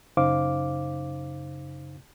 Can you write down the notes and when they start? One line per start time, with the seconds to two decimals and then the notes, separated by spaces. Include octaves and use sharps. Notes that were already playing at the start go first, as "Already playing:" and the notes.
0.17 F#2 C#3 D#4 C5 F5 D6